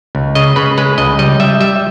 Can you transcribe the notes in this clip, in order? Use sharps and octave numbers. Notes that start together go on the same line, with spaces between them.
C#2
C#3 D#5
C#3 B4
G#3 B4
C#2 D#5
G3 D#5
G3 E5
G3 E5